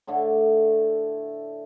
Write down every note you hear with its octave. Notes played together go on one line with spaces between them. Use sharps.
A2 D3 A3